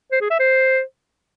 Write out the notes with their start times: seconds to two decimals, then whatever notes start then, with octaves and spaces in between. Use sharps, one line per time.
0.12 C5
0.21 G#4
0.30 E5
0.40 C5